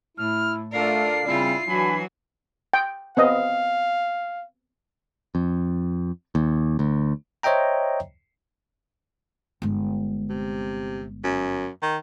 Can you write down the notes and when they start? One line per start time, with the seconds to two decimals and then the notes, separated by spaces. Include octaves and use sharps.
0.17 A2 E4 F6
0.72 A3 D4 F4 A4 A#4 D5 F5 C7
1.25 C#3 G3 C4 E4 F4
1.67 E3 F#3 D4 F#4 G#5 B5
2.73 G5
3.17 B3 C4 D#5 F5
5.35 F2
6.35 D#2
6.79 D2
7.43 C5 C#5 D#5 E5 G5 A#5
9.62 G1 G#3
10.30 C3
11.24 F#2
11.82 D#3